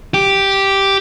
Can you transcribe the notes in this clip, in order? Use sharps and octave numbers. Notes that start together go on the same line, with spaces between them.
G4